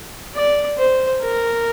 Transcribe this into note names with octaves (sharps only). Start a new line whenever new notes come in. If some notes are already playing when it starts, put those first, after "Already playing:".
D5
C5
A#4